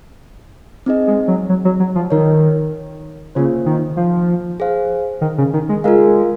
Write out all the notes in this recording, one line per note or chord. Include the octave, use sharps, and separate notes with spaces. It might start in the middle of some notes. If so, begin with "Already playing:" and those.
C4 D#4 G#4 D#5
G#3
F#3
F#3
F#3
F#3
F3
D#3 D#4 A#4 C#5
C#3 A#3 F4 C5
D#3
F3
G#4 C5 F5
D#3
C#3
D#3
G#3
G#3 F4 A#4 F5